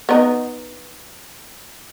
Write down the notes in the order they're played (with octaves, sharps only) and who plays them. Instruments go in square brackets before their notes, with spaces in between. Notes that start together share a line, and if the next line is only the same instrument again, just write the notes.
[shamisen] B3 D#4